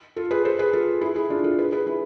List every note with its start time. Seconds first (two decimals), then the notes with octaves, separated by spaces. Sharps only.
0.16 F4 A4
0.31 G#4 B4
0.45 A4 C5
0.59 G#4 B4
0.73 F4 A4
1.01 E4 G#4
1.16 E4 G#4
1.30 D4 F4
1.44 F4 A4
1.59 G#4 B4
1.72 G#4 B4
1.87 E4 G#4